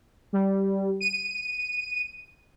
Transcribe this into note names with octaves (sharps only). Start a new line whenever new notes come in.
G3
D#7